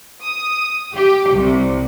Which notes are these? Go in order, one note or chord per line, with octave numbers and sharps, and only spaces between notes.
D#6
G4
C2